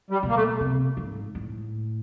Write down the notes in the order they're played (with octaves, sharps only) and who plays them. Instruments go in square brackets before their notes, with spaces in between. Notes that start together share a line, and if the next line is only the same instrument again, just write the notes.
[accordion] G3
[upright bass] B2
[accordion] A#3
A3
[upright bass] C3
G#2
A2